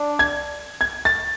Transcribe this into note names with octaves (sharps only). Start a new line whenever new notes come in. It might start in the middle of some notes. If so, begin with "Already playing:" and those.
Already playing: D4
G#6
G#6
A6